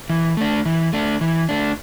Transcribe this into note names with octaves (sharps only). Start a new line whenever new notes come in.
E3
A3 D4
E3
A3 D4
E3
A3 D4